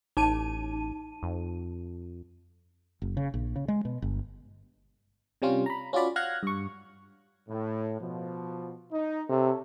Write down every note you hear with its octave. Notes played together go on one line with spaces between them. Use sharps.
A1 D#4 A5 D#7
F2
F#1
C#3
A#1
C#3
G#3
B2
G1
C3 G3 C#4 F4
A#5 B5
C#4 F4 F#4 D5 B5
F5 F#5 F6 F#6 G#6 A#6
G2 C#6
A2
B2 F3
D#4
C3 C#4 A4